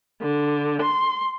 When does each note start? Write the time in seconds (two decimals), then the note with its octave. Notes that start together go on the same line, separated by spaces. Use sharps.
0.21 D3
0.83 C6